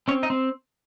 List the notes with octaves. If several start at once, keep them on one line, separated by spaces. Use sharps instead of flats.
C4 C#4 C#5
D#4 D#5
C4